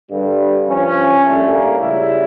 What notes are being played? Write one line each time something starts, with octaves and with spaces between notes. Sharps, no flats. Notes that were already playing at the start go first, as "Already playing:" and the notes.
G2 D3 G3
G2 F3 C#4
A#1 A2 G3 A3
A#3
C#2 C#3 G3 E4